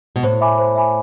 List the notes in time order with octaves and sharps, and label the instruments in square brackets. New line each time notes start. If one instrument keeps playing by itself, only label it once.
[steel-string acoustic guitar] B2
[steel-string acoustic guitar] A2 [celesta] C5
[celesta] E5 G#5 B5 D6
C5
E5 G#5 B5 D6